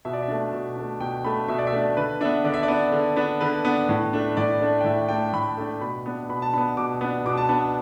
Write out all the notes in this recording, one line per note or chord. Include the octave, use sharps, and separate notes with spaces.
B2 E5
D5
E5
A3 D4
B2
A3 D4
B2 G5
A3 D4 B5
B2 E5
D5
E5
A3 D4
D3 B4
B3 D4 E5
D3 D5
E5
D5
B3 D4
D3
B3 D4
D3 B4
B3 D4
A2
A3 D4
A2 D5
A3 D4
G5
A2 E5
A3 D4 G5
A2 B5
A3 D4
B2 B5
B3 D4
B2 B5
A5
B3 D4 B5
B2 D6
B3 D4
B2 D6
A5
B3 D4